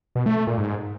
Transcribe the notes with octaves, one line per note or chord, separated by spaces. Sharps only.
B2
A3
A3
A#2
G#2